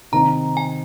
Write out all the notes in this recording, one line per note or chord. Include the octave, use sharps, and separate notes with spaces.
C3 D#3 C4 D#4 A#5
G#5